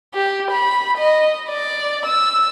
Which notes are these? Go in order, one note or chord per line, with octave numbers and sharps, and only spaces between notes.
G4
B5
D#5
D5
E6